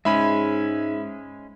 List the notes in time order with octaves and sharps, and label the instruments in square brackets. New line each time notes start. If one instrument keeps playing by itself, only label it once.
[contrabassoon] G#2 [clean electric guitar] G#3 C#4 [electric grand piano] E5 B5